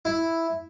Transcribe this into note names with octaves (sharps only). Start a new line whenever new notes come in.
E4